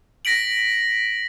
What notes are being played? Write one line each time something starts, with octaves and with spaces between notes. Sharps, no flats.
A#6 B6 D7 F#7